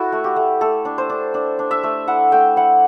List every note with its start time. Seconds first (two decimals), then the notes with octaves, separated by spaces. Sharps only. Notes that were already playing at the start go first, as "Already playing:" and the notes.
Already playing: E4 F#4 A4
0.12 A3
0.24 G4
0.36 A3
0.61 A3 A4
0.85 D4
0.98 C5
1.09 D4
1.34 D4
1.59 D4
1.71 E5
1.83 A3
2.08 E4 F#5
2.32 A3 G5
2.56 E4 F#5